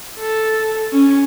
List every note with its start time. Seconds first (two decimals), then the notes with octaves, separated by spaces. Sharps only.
0.18 A4
0.93 C#4